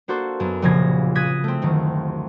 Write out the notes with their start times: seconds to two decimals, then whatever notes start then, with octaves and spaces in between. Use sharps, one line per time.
0.08 A#3 D4 F#4 A4 C5
0.40 F#2 F#3 B3
0.62 F1 A#1 C#3 F3 G#6 A#6
1.15 D#6 F#6 G#6 A#6 B6 D#7
1.44 A3 C4
1.62 F#1 D2 D#3